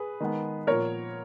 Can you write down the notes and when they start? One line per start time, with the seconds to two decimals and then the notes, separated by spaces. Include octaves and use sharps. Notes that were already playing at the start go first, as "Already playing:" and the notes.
Already playing: G#4 B4
0.20 D#3 G#3 B3
0.67 A#2 F3 B3 A#4 C#5